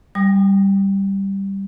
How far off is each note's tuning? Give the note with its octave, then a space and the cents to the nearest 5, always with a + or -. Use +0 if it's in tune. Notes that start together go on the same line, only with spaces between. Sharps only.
G3 +0 G#5 -45 D#6 -40